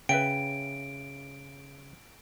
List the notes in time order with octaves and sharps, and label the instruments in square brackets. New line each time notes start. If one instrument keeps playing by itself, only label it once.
[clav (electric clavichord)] C#3 [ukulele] B4 E5 G5 [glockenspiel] D7